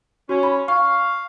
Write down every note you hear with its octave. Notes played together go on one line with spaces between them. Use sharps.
C#4 F#4
B5
F5 C#6